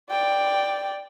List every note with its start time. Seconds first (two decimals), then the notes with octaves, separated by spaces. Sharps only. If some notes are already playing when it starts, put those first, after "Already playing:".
0.10 D5 G5